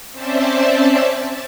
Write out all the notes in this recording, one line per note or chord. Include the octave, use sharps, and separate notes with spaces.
C4 C#4 C5 D5 E5 A5